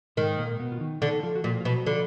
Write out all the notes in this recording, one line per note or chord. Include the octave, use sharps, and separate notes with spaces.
G#2 D#3 G#3
A#2 A#3
B2 B3
F4
D#3 D#4
D3 D#3 D#4
F3 F4
F#4
A#2 F3 F4
F4
B2 F#3 F#4
D3 F3 F4